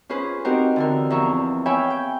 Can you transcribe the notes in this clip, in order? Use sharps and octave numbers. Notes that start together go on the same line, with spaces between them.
C#4 F4 G#4 B4 C5
C4 D#4 F#4 G4 A#4 C5
D3 E3 A#4
E2 F3 A#4 E5 A#5 C#6
C#5 E5 F5 G5 G#5 B5
G5